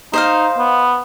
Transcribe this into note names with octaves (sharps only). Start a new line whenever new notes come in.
D#4 C5 D#5 F5
B3